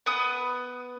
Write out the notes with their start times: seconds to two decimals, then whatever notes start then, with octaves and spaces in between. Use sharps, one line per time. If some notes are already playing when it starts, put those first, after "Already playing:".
0.06 B3 D#6